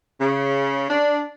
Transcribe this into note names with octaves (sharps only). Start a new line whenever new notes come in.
C#3
D4